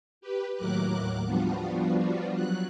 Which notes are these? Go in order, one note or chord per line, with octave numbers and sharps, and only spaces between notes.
G4 B4
D#2 A2 F#3 A#4 D6 F#6
F3 G3 B3 D4 F4 F#4
F#3 F#6